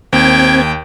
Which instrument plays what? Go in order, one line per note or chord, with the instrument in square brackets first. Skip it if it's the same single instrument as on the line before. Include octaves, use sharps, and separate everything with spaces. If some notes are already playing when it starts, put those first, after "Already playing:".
[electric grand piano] D#2 [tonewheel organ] C4 G#6 [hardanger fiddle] G5